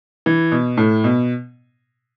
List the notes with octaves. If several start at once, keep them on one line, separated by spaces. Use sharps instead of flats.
E3
B2
A2
B2